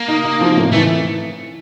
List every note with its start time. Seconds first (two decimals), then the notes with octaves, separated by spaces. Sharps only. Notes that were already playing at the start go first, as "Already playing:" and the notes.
Already playing: A#3
0.08 D#4
0.24 D#4
0.41 F3
0.57 A2
0.73 E3 A3